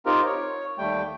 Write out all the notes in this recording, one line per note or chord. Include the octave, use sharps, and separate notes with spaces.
C4 D#4 F4 G4 A#4
C#5
D#2 G3 A3 G5